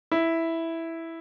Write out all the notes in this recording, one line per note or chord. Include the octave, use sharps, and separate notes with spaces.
E4